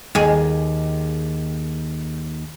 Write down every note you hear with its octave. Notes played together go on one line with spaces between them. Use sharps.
D#2 G#4